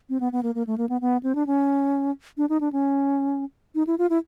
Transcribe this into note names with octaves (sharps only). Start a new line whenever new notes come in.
C4
B3
B3
A#3
A#3
A3
A#3
B3
B3
C4
D4
C#4
D4
D#4
D4
C#4
D#4
E4
F4
E4